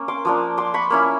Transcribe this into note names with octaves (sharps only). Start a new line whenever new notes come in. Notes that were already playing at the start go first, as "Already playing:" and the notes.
Already playing: A#3 C#4
C6 D6
F3 A#3 D4
C6 D6
B5 C#6
A#3 C#4 E4